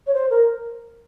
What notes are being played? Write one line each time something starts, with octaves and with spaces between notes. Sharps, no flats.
C#5
C5
A#4